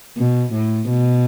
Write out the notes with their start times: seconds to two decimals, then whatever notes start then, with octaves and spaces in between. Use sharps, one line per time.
0.17 B2
0.53 A2
0.89 B2